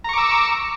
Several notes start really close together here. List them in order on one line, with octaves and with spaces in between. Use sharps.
A#5 C#6 D6 E6